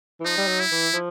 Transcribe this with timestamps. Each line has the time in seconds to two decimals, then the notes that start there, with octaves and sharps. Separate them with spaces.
0.20 E3
0.25 F3 D#4
0.37 G3
0.47 F#3
0.60 E4
0.72 E3
0.94 F3